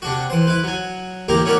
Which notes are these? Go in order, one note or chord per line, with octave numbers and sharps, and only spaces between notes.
C3 D4 F#4
E3 C5
E4 B4
F#3 G#5
A1 A#3 E4 G4 A#4 A#5
C#4 E4 F#4 A#4 D5